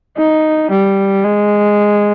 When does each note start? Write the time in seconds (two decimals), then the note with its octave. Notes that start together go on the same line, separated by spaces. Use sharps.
0.17 D#4
0.71 G3
1.24 G#3